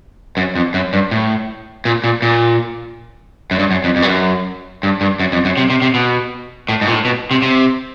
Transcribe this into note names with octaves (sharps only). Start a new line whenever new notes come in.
F#2
F2
F#2
G2
A2
A#2
A#2
A#2
F#2
G2
F#2
F2
F2
G2
F#2
G2
G2
F#2
F2
F#2
C3
C3
C3
B2
A2
G#2
A#2
A2
B2
C3
C3